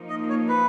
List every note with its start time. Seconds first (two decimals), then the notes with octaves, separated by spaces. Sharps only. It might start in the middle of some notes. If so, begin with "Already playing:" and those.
Already playing: F3 A#3 D#4
0.10 D#5
0.29 C#5
0.49 B4